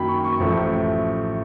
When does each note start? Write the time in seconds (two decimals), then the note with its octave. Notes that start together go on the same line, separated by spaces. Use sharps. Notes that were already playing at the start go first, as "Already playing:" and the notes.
Already playing: F#2 D#3 F#3 A#3 G5 B5
0.08 C#6
0.24 C#6
0.40 A1 A2 F3 A3